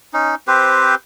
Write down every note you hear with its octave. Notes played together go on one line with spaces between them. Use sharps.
C#4 D#4
C4 G4 B4 C5